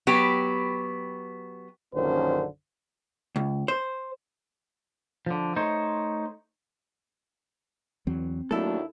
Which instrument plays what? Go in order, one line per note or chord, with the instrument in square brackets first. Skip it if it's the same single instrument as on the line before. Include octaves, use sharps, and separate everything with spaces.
[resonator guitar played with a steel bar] F#3 B3 G4
[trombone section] A#1 F#2 D3 D#3 C#4 C5
[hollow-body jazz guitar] C#2
C5
[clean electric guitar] D3 F3
A3 D#4 C5 C#5
[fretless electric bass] E2 E3 F#3 [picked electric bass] C4
[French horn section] D#2 D4 F#4 [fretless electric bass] F#3 A3 A#3 [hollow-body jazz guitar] E4 A4